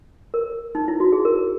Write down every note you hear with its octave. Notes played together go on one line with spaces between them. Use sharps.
A#4
D#4
E4
F#4
G#4
A#4